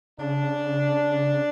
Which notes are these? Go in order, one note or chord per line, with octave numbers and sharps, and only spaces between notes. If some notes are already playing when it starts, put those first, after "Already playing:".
C#3 D4